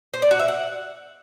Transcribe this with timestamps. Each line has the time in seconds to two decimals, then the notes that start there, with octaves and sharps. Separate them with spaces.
0.14 C5
0.22 D5
0.31 F#4
0.40 E5
0.48 F#5